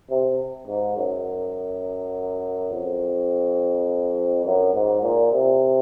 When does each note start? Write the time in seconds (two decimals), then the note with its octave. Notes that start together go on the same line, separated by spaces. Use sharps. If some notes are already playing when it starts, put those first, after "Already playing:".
0.10 C3
0.67 G#2
0.96 F#2
2.71 F2
4.45 F#2
4.74 G#2
5.02 A#2
5.32 C3